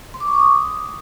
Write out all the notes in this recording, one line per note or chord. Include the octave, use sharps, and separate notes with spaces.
C6
D6
C#6
D6
D#6